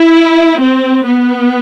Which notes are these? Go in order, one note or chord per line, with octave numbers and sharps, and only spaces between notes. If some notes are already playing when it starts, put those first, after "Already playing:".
Already playing: E4
C4
B3